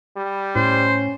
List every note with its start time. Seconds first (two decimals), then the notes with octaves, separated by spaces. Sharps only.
0.17 G3
0.56 A2 C#4 C5